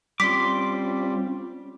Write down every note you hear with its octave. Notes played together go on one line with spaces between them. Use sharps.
G3 C4 C#4 F4 C6 D6 B6